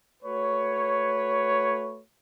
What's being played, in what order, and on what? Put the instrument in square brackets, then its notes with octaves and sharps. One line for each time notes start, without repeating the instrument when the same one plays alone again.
[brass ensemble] A3 F#4 B4 C#5